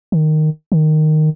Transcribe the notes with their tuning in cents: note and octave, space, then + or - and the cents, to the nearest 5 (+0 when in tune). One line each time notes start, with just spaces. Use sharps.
D#3 -10
D#3 -10